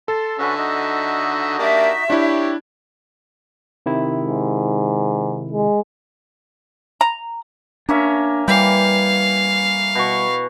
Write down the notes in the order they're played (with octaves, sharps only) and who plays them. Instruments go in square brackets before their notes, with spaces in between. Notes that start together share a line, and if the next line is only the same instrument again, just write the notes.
[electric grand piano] A4 [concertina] A5 C6
[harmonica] D3 E5 [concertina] C#4 F#4 B4
[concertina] D#4 F#4 D#5
[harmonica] A#3 D4 G4 [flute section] E5
[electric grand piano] D4 E4 [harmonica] G4 C#5
[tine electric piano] C3 D#3 E4
[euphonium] G#2
G#3
[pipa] A#5
[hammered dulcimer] A#3 C#4 E5 [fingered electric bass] D4
[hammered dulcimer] E3 G5 [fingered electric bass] G3 [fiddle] F5
[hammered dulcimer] B2 C#6